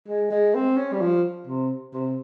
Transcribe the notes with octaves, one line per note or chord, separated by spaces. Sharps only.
G#3
G#3
C4
C#4
G3
F3
C3
C3